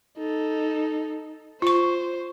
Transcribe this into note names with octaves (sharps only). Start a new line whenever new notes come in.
D#4 A4
F4 C5 C#6